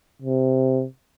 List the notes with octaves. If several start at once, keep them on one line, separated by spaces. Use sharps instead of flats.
C3